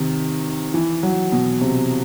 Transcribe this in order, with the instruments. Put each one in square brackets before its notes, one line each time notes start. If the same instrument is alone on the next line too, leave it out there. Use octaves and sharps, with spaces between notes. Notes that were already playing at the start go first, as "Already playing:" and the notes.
Already playing: [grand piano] C3 D#3
E3
F#3
B2
C3